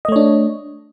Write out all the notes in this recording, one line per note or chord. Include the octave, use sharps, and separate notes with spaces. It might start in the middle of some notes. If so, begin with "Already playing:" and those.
A3 D4 C#5 D#5